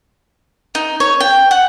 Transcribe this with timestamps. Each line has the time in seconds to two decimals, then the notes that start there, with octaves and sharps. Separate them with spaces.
0.75 D#4
1.00 C#5
1.20 G5
1.51 F#5